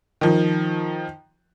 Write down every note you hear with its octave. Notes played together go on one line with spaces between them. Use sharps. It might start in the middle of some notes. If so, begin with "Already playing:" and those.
D#3 F3